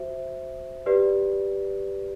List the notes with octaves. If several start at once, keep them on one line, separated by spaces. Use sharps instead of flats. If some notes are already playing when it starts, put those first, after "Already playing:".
Already playing: F#4 C5 E5
G4 B4 D5